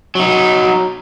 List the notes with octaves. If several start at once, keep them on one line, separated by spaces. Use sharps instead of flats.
F#3 D#4